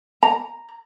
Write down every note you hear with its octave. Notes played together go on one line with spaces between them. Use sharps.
A#5